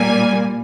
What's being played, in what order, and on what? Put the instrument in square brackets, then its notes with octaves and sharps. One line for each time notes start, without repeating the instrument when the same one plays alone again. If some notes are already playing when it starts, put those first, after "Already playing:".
Already playing: [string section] A#2 G3 A#3 G#5